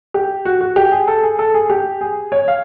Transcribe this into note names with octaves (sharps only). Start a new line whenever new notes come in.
G4
F#4
F#4
G4
G#4
A4
G#4
A4
G#4
G4
G#4
C#5
F5